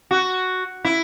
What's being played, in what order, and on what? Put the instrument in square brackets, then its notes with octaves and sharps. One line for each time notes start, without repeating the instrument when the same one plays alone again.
[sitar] F#4
E4